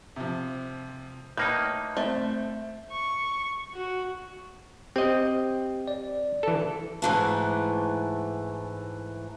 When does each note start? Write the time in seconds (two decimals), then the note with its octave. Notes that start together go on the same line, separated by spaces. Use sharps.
0.16 C3 F3
1.37 A2 A#3 D#4 B4 G6
1.97 A3 C4
2.92 C#6
3.74 F#4
4.96 C4 G4 D#5 G5
5.88 D5
6.43 E3 A4
7.02 G#2 E3 A3